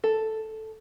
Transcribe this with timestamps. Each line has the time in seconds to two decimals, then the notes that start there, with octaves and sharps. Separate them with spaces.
0.04 A4